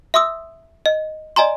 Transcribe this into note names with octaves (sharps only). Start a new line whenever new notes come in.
E5 C6 D#6 E6
D#5
D5 D#5 G#5 A#5 C6